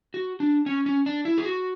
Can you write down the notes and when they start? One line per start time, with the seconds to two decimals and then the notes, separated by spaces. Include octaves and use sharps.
0.14 F#4
0.40 D4
0.66 C#4
0.86 C#4
1.06 D4
1.25 E4
1.38 G#4
1.45 F#4